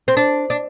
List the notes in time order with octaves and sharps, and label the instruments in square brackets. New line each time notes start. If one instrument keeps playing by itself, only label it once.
[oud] C4
D4
D4